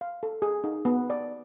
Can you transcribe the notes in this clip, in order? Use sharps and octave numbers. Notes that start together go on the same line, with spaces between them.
F5
A4
G#4
D#4
B3
D5